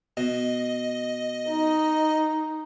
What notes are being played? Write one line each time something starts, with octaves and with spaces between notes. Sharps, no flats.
B2 D#5
D#4